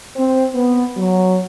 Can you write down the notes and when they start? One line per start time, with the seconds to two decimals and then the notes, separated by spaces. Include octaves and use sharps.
0.16 C4
0.54 B3
0.97 F#3